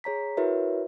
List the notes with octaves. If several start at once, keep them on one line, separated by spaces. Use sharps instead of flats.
G#4 C#5 A#5 B6
E4 F#4 A#4 B4 C#5 E5